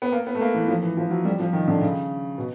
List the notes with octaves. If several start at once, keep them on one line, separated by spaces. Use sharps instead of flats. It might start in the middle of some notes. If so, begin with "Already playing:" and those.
B3
A#3
B3
A3
A#3
E3
F3
E3
F3
F#3
G3
F3
D#3
D3
C#3
B2